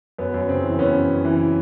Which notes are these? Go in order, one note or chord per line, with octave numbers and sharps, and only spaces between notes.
F#2 B3
F#2
C#3 C4
E3
F#2 B3 C#4
F#2
C#3
E3